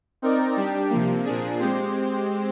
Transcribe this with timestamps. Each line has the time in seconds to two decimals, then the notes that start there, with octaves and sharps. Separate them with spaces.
0.22 C4 D#4 A#4 D5
0.57 G3 D4 G4
0.90 C3 F3 A#3
1.24 A#2 F3 A#3 D4 G#4
1.60 G#3 C4 G4 C5